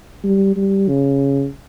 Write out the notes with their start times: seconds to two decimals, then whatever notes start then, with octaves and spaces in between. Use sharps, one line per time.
0.24 G3
0.56 G3
0.88 C#3